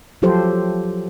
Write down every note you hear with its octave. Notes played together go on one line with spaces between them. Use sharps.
F3 F#3 F4 G4 A4 C5